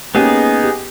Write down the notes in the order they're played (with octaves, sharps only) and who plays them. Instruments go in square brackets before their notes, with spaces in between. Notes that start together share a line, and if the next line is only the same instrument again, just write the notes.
[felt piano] A#3 C#4 G4 [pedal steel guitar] B3 D#4 G#4
[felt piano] G4